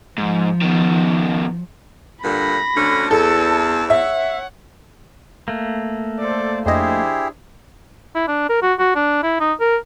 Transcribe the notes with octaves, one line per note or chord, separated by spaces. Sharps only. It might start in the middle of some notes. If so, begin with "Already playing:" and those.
G#2 F3
B2 D#3
G2 A#2 D3 B5 A#6
D2 D3 C#4
E2 A4 A5 E6
C#5 E5 F#5
A3 A#3
A4 C5 D5
F2 D4 E4 G4 G#4 C5 D#5
E4
D4
A#4
F#4
F#4
D4
E4
D#4
A#4